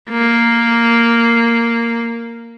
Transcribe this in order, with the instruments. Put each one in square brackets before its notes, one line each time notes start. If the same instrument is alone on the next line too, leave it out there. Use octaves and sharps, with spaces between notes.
[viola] A#3